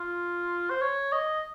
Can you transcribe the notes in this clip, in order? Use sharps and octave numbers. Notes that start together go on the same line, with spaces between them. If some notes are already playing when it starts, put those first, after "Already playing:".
Already playing: F4
C5
C#5
D#5